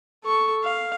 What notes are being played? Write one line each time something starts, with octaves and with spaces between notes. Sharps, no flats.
A4 C#6
F5